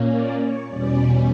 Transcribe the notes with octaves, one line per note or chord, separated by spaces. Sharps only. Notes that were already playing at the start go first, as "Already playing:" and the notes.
Already playing: A#2 A#3 C#4
D5
C#5
E2 B2 G3 C#4 D5